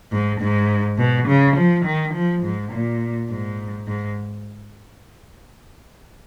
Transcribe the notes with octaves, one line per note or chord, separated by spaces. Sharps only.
G#2
G#2
B2
C#3
F3
D#3
F3
G#2
A#2
G#2
G#2